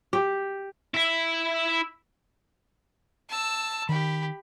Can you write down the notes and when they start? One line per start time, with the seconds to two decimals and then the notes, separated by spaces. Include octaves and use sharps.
0.13 G4
0.94 E4 E5
3.29 A5 E6
3.89 D#3 G4 B5